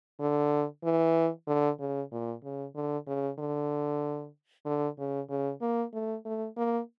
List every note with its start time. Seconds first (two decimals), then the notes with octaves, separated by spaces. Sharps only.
0.20 D3
0.84 E3
1.47 D3
1.80 C#3
2.12 A#2
2.44 C#3
2.75 D3
3.07 C#3
3.39 D3
4.65 D3
4.98 C#3
5.30 C#3
5.61 A#3
5.93 A3
6.25 A3
6.57 A#3